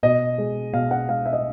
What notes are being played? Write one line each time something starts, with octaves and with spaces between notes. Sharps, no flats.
B2 D#5
G#3
B2 F5
F#5
G#3 F5
E5
D#5